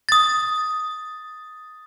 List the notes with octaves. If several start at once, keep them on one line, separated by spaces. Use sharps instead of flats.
D#6 A6